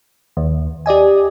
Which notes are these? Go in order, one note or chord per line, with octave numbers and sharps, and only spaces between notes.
D#2
G4 D5 D#5 G#5